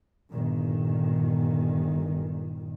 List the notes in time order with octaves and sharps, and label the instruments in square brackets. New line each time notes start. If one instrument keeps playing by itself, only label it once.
[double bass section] G1 A#2 D#3